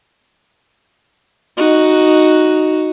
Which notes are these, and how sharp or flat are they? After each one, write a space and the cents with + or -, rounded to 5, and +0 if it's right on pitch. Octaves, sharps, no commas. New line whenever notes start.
D#4 +0 F#4 +0